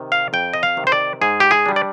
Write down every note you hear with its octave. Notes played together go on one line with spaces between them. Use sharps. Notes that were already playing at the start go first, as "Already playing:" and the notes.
Already playing: C3 D#3
F5
F2 G5
D#5
F5
C3 D#3
C5
D5
G#2 G#4
G4
G#4
G3 D4
D5